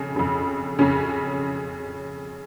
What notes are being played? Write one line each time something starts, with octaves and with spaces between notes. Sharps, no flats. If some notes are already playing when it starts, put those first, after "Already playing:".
Already playing: F2 C#3
F2 C#3
F2 C#3 C#4